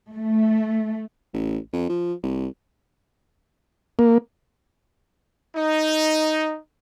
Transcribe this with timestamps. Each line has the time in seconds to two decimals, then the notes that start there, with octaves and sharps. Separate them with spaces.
0.14 A3
1.33 A1
1.73 F2
1.89 F3
2.23 C2
3.99 A#3
5.56 D#4